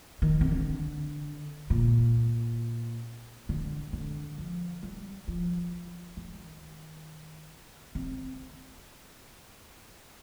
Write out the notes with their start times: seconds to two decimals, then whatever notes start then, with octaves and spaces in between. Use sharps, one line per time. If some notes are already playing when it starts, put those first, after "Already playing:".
0.22 D#3
0.41 C3
0.51 D3
1.70 A#2
3.49 D3
3.93 D3
4.38 F3
4.83 G3
5.28 F3
6.17 D#3
7.95 C3